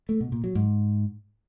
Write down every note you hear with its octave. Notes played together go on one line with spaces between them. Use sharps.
A3
B2
A#2
F#3
G#2